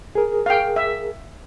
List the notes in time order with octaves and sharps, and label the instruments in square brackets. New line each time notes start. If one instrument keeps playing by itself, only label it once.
[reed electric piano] G#4 A#4
[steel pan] F5 G5
E5